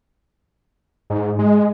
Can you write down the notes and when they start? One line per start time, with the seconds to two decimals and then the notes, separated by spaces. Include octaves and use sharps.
1.10 G#2
1.39 G#3